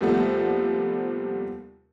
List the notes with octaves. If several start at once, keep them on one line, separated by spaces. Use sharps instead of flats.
D#2 C3 F3 G3 A3 B3